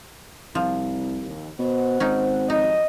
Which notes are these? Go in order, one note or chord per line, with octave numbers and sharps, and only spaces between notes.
C2 F3
D#2
B2 C5 F#5
G#1 C#4 D#4
F2 F#3 D#4 D#5